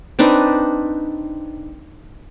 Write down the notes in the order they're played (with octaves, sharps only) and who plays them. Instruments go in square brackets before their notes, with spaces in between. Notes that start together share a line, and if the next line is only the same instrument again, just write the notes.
[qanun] C4 D4 D#4 B4